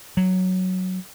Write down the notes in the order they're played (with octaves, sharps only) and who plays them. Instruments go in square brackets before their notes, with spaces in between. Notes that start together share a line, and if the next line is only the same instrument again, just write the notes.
[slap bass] F#3